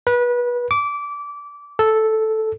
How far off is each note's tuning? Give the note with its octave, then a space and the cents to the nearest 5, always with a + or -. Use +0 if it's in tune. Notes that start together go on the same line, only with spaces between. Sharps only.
B4 -25
D6 -20
A4 -5